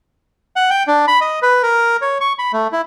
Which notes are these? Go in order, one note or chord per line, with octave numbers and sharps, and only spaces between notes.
F#5
G5
D4
B5
D#5
B4
A#4
C#5
C#6
B5
A3
E4